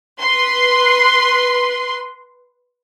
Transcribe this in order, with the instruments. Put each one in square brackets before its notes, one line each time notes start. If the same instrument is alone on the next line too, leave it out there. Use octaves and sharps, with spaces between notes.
[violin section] B4 C6